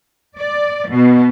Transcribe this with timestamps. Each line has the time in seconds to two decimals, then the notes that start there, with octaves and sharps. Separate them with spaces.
0.37 D5
0.90 B2